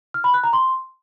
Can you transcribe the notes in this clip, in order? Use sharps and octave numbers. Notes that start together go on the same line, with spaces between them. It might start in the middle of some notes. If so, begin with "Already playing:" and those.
F6
B5
F#6
A#5
C6